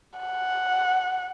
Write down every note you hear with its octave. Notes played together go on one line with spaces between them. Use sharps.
F#5